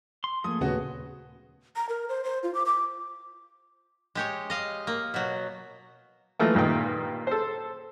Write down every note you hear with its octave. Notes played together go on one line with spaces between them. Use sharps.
C6
F3 A3 A#3 G#4 D#6
D#2 A#2 C#3 B3 F#4
A#5
A#4
C5
C5
F4
D6
D6
G#3 G4 C#5
D#5 F5
A#3
B2 F#3
E3 F3 A3 A#3
G2 A#2 D#3 G5
A4 C5